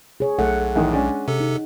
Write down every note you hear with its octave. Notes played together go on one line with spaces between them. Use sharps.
G#4 C#5
B1 A3 F#5
E2 A2 D#3
G#3 C#4 D4
C3 A4
D#4